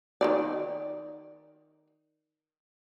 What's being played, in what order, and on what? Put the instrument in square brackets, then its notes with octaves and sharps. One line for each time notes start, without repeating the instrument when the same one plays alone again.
[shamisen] D#3 E3 D5